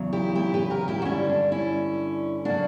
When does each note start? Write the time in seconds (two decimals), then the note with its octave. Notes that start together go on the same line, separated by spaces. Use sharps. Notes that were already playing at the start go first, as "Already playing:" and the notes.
Already playing: E2 C#3 F#3
0.13 E4 G4
0.35 E4 G4
0.54 G4 B4
0.70 F#4 A#4
0.88 E4 G4
1.02 F#4
1.05 G2 D3 G3 C#4 E4
1.29 D4
1.52 C#4 E4
2.45 C#3 F#3 A#3 D4 F#4